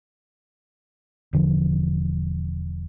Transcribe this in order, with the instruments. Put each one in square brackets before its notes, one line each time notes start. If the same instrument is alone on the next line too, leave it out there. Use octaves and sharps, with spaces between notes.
[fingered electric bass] E1 D3 F3